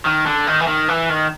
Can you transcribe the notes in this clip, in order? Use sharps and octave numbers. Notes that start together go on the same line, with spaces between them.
D#3
D3
D#3
E3
D#3
E3
D#3